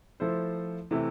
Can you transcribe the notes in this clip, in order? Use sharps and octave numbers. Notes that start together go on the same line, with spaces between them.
F3 A3 E4 A4 C5
C3 E3 A3 E4